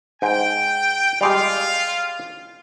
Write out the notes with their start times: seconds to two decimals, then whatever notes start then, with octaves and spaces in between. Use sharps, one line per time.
0.22 G#2 G5
1.21 G3 G#3 F4 G4 F5